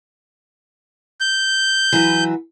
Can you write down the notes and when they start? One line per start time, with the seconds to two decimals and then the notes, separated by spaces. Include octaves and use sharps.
1.20 G6
1.92 E3 F#3 B4